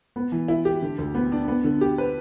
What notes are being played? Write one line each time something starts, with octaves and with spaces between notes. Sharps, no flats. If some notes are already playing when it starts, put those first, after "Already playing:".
B3
E3
E4
G4
D3
D2
B3
D4
B3
D3
G4
B4